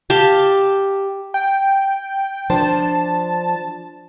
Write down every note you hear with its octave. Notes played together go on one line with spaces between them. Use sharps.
G4 F5 A5
G5
F3 D4 C5 A5